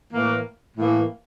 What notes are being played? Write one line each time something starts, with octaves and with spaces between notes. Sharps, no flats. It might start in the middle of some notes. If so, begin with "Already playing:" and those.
A2 E3 A#3
A2 E3 A#3